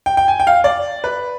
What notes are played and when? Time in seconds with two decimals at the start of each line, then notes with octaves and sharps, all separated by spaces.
0.06 G5
0.17 G5
0.28 G#5
0.40 G5
0.47 F5
0.64 D5
1.04 B4